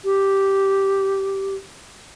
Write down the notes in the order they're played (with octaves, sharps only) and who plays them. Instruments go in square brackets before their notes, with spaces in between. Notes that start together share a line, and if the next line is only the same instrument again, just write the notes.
[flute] G4